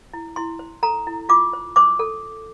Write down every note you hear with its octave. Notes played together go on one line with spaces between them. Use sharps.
E4
E4 C6
C5
A4 A#5
E4
F4 D6
C5
C5 D6
A4